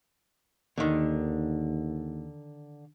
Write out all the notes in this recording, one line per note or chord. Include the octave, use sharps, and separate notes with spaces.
D#2 D3 D#3